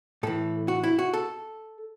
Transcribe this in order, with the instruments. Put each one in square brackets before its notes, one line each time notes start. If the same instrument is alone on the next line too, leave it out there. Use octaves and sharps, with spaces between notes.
[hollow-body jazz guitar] A2 E3 A4
F#4
E4
F#4
A4